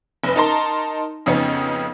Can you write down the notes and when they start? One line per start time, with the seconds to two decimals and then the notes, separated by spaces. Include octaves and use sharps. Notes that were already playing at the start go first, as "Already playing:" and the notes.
0.24 F#1 B4
0.36 D#4 A#4 A5 A#5 C6
1.26 F2 C#3 B3 C#4 D#4